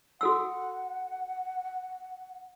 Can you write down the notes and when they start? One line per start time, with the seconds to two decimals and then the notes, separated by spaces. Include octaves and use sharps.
0.21 F#4 A4 F#5 E6